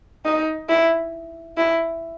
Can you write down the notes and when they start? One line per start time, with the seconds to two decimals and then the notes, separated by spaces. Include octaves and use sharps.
0.25 D#4
0.69 E4
1.57 E4